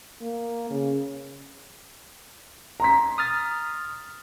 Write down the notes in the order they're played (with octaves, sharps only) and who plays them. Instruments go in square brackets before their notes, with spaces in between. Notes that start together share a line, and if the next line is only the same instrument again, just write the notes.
[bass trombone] A#3
C#3
[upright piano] A#5 C6 B6
[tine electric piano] D#6 F6 A6